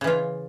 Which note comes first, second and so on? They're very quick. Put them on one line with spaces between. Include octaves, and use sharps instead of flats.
C#3 E3 F4